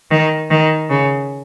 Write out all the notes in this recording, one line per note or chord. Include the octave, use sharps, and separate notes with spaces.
D#3
D#3
C#3